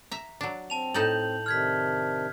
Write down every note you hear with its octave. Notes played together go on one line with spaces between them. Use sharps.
E5 A#5
F#3 D4
C4 A5 F7
A2 D#4 A4 G6 F#7
C3 D#3 D4 F6 G#6 B6